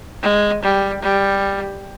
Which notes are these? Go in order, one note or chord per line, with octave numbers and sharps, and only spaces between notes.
G#3
G3
G3